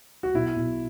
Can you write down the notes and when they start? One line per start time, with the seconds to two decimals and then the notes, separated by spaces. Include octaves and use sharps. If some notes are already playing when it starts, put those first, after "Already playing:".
0.23 F#4
0.34 B1 E4
0.56 B1